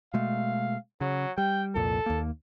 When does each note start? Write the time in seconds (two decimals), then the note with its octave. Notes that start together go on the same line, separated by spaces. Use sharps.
0.14 B2 G#3 A3 F5
1.01 C#3 F#3
1.38 G3 G5
1.75 C2 F2 A#2 A4
2.06 D#2 A#3